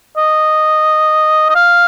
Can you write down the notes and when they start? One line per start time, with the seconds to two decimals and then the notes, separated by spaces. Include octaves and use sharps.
0.17 D#5
1.50 D#5
1.55 F5